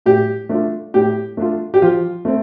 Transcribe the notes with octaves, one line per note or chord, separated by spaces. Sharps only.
A2 G4
A3 D4 F4
A2 G4
A3 D4 F4
G4
F3 F4
A3 C4